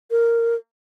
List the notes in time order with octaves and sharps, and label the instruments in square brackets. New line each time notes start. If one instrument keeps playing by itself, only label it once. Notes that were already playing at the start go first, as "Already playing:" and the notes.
[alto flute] A#4